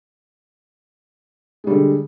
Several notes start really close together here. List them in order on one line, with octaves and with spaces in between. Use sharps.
G#3 G3 D3